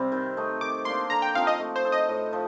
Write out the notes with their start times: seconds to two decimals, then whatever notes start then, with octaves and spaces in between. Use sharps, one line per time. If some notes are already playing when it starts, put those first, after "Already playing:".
Already playing: C3 G3 C4
0.12 D#3
0.37 A3 D#4
0.61 D#3 D6
0.85 A#3 D4 C6
1.10 D3 A#5
1.22 G5
1.34 F3 C4 D#4 F5
1.47 D#5
1.59 A3
1.76 C5
1.84 D#4 A4
1.92 D#5
2.09 A2
2.33 F3